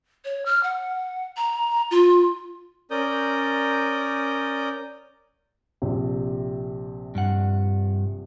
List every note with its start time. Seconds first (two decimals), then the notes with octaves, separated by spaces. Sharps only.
0.25 C#5
0.46 F6
0.63 F#5
1.37 A#5
1.91 F4
2.91 C#4 A#4 D5 D#6 G6
5.82 A#1 C3
7.15 G2 F#5